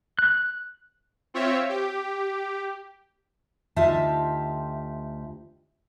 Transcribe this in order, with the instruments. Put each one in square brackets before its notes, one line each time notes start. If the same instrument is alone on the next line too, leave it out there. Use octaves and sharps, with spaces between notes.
[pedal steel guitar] F#6
[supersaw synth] C4 F4 C#5 E5
G4
[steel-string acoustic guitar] D2 D#4 F4 G4 E5 A5